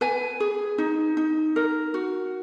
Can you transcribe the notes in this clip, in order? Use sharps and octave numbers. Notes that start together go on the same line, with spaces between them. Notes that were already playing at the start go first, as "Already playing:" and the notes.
B4 G#5
G#4
D#4
D#4
A#4
F#4